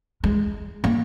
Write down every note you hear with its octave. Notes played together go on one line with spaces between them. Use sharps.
G#3
A#3